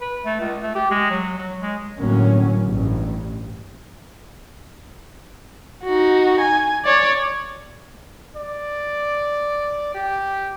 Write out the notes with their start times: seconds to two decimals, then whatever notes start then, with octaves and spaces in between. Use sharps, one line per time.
0.01 B4
0.25 A3
0.40 C#2
0.62 A3
0.75 G4
0.91 G#3
1.11 F#3
1.38 F#3
1.61 G#3
1.99 G1 A2 D3 F#3 A#3 C#4
2.65 A1 G2
5.84 D#4 F#4
6.41 G#5
6.85 C#5 D5
8.36 D5
9.94 G4